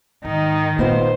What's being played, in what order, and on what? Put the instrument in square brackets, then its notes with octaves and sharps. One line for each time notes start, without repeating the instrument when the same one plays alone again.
[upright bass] G#2 [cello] D#3 [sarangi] D#4
[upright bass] A#2 [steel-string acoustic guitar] B3 D#4 F4 [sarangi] C5